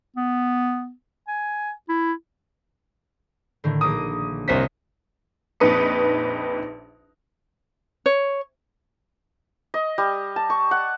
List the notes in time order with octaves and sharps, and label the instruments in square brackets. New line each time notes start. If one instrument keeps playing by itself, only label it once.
[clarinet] B3
G#5
E4
[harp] A2 D3 D#3
[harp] A#1 A#5 D6 [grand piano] D#6
[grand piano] C2 C4 B6 [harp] C5 C#5 D#5
[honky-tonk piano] A#1 F2 D#4 B4 D#6 C#7
[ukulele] C#5
[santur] D#5
G3
A5
C#6
F#5